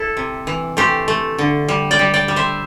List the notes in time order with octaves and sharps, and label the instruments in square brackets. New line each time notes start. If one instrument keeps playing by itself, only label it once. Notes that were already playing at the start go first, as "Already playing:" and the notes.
Already playing: [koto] E4 A4
C3
E3
A3 G4 C5
A3
D3
G3
D5 G5
G3
D5 G5
G3
C5 E5